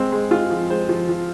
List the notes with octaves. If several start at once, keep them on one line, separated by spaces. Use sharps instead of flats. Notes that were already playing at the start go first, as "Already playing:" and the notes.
Already playing: G#3 C4
G#3
G#3 F4
F3
G#3 C5
F3
F3